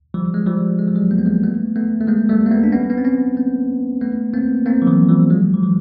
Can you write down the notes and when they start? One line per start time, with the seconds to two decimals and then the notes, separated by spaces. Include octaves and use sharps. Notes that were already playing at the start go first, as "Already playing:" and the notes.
0.14 F3 G3
0.34 G#3
0.46 F3 G3
0.79 G#3
0.88 G3
0.95 F#3 G#3
1.11 A#3
1.18 B3
1.26 G#3 A#3
1.44 A3 B3
1.76 A3 B3
2.01 A3
2.08 G#3 A#3
2.29 G3 A3
2.46 A#3
2.51 A3 B3
2.64 D4
2.72 B3 C#4
2.90 B3
2.98 C4
3.05 B3 C#4
3.37 A#3 C4
4.01 A3 B3
4.34 A#3 C4
4.66 A#3 C4
4.82 F3
4.87 E3 F#3
5.09 F3 G3
5.30 F#3 G#3
5.54 F3
5.63 E3 F#3